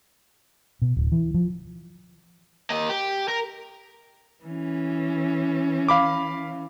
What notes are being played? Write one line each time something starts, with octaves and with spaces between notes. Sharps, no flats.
B2
D1
E3
F3
A#3 D#5
G4
A#4
E3 C#4
F5 B5 D6